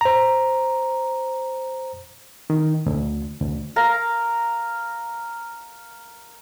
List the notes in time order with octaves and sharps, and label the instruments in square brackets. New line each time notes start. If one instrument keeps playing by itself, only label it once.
[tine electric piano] C5 A#5
[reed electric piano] D#3
D2
D2
[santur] A#4 F5 A#5